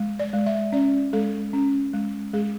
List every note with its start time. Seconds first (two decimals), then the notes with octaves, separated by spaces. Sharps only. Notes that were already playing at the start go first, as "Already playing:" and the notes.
Already playing: G#3
0.19 D5
0.33 G#3
0.46 E5
0.72 C#4 D5
1.13 G#3 A4
1.53 C#4
1.93 G#3
2.34 G#3 G#4